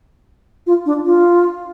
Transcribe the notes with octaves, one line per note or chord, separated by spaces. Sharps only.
F4
D4
F4